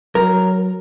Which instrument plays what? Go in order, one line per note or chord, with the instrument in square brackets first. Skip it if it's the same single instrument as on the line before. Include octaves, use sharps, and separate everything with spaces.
[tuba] F#3 [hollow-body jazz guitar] A#4